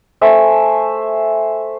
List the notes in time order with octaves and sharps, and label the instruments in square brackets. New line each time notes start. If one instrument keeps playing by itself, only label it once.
[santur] A3 C5 E5 G#5